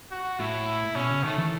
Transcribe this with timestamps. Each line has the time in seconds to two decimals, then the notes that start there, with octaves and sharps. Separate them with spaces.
0.11 F#4
0.40 A2 E4
0.95 B2 C#4
1.10 C#3
1.24 D#3 A3
1.38 E3